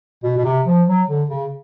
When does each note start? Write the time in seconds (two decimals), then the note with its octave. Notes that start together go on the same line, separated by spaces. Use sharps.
0.23 B2
0.37 B2
0.45 C3
0.66 F3
0.87 F#3
1.08 D3
1.29 C#3